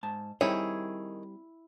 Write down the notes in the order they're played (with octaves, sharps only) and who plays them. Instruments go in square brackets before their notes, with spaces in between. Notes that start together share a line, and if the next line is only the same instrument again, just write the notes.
[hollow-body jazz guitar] G#2 A5
[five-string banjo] D#3 G#4 C#5 [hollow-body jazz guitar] G3 C4 [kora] E4